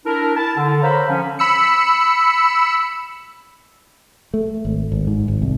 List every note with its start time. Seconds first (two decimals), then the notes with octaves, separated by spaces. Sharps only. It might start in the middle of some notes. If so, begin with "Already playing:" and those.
0.06 D4 E4 A#4
0.36 E4 A5
0.57 D3
0.83 A#4 C5 C#5 F5 A#5 B5
1.08 D3 F3 C#4
1.39 B5 E6 C#7
4.34 A3
4.65 G#1
4.92 G#1
5.07 G#2
5.28 G#1
5.42 C2